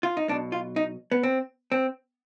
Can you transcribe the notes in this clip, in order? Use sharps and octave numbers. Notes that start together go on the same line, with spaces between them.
F4
D#4
B1 B2 D4
F4
D#4
B3
C4
C4